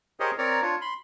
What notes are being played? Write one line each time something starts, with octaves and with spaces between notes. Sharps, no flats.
G4 G#4 A#4 C5 C#5 D#5
C4 A#4 C#5 D5 A#5
D4 F4 C#5
B5 C6